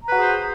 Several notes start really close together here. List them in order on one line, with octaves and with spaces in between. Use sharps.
A#5 B4 F#4 G#4 C5